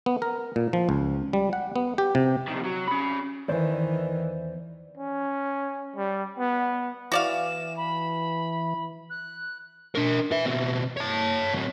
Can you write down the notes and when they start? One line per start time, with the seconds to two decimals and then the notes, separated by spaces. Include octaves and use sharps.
0.06 B3
0.22 A#4
0.56 A#2
0.73 F3
0.89 C#2
1.33 G3
1.53 F#5
1.76 B3
1.98 G4
2.15 C3
2.48 F2 D#3
2.64 F#3
2.88 C#4 B5
3.49 E2 D#3 E3 C5 D5
4.97 C#4
5.96 G3
6.39 B3
7.12 E3 F#4 D5 F5 E7
7.76 B5
9.10 F#6
9.95 D4 A#4
10.32 B4 E5
10.46 B2 C4
10.97 C#5 A5
11.55 F#3 C4